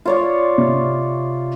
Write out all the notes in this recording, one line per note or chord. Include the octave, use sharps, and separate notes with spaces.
F4 C#5 D5
C3